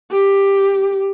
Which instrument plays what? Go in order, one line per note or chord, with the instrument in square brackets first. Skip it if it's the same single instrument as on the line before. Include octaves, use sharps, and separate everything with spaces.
[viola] G4